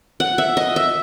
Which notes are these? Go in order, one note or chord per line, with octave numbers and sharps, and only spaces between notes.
F#5
E5
D#5
E5